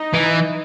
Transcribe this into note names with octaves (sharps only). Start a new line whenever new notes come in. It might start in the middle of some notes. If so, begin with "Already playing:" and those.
Already playing: D#4
E3